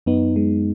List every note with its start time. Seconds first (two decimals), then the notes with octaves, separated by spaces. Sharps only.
0.06 F#2 B3 D#4
0.36 G#3